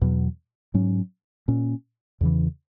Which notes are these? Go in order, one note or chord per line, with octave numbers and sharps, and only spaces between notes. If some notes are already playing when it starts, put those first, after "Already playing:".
E2 B2 F#3
G#2 F#3 C#4
A#2 A#3 C#4
E2 C#3 E3